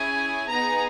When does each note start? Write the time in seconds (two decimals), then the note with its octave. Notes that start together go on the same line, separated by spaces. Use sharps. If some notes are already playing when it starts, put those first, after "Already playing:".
Already playing: C#4 E4 G#4 G#5
0.48 B3 D#4 G#4 A#5